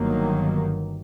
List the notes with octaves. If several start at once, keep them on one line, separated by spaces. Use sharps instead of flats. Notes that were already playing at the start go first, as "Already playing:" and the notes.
Already playing: G1 G2 D#3 F#3 A#3